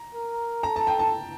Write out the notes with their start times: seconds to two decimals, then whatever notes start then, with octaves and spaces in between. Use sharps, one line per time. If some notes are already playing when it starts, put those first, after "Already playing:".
Already playing: A#5
0.14 A#4
0.63 A4 A#5
0.76 A5
0.87 G5
0.99 A5